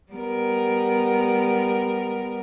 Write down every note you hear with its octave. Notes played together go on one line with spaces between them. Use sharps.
G3 B3 A#4